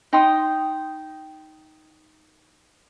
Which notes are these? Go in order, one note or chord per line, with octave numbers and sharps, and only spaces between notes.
D#4 G5 C6 D#6